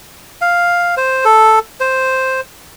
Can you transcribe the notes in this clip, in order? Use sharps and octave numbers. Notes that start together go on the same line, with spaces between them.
F5
C5
A4
C5